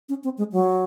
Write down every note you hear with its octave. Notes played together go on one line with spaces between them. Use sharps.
C#4
C4
G#3
F#3